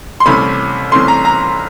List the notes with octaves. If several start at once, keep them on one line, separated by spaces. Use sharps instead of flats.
C6
C2 C3 E3 A3 C#4 B5
C2 C3 E3 A3 C#4 C6
A#5
A#5